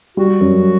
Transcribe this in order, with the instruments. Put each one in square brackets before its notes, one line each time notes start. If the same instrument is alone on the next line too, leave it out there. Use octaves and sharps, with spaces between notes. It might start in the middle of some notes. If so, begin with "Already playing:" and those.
[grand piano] G3 [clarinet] F#4
[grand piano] F#2